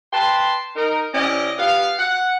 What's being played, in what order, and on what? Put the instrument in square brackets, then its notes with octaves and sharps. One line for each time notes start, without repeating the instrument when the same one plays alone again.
[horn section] B4 G5 A5 C6
D#4 A#4
C3 C#4 E4 D5 D#5
B3 G4 F5
F#5